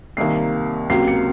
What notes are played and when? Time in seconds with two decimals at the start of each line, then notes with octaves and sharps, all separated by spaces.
0.17 C2 C3 D#3 A#3 C7
0.90 C#2 C3 F#3 A#3 C7
1.08 C#7